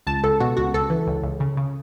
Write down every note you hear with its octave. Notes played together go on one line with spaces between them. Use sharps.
C#2 A5
C#2 A4
B2 F#4
C#2 F#4
C#2 A4
E3
C#2
C#2
C#3
C#3